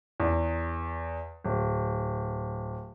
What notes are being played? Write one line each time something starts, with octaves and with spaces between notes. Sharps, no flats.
E2
D1